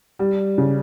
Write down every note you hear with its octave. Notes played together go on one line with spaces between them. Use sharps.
G3
C#3